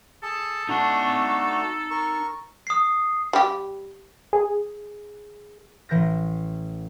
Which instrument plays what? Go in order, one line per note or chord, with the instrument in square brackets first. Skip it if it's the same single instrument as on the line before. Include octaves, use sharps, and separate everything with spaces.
[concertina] G#4 A5 [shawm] A4
[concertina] A3 D4 F#4 [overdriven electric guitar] D#4 A5
[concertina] A#4 C#6
[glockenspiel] D#6 C7
[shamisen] G3 G4
[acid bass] G#4
[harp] A1 E3 G6 A#6